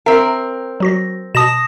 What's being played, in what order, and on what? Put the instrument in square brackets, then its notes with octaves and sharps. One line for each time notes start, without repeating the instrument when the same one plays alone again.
[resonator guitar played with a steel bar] C4 A#4 [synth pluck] E5
[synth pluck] F#3 F#4 A#6
[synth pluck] B2 A5 [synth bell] D#6 A#6 E7